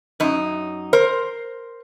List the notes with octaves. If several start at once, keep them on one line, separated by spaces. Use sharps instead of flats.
F#2 D#4
A#4 C5